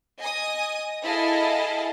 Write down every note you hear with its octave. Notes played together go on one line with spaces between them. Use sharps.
D#5 G#5 D#6
E4 G#4 A4 D#5 F5 A5